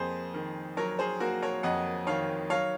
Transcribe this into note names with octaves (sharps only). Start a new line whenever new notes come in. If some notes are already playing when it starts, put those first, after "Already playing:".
Already playing: F2 A#3 G#4 C5
D#3
F#3 A#4 C#5
G#4 C5
A#3 F#4 A#4
A#4 C#5
F2 D#5 F#5
D#3 C#5 F5
F#3 C#5 F5